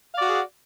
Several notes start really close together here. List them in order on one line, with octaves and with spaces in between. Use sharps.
F5 D5 F#4 F#5 G#4